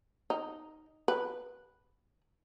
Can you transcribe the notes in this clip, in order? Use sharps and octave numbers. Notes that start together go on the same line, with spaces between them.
D#4
B4